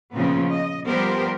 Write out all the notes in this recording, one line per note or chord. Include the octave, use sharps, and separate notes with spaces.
A#2 C#3 F3 B3 C4
D#5
F3 G3 B3 G4 A#4 C5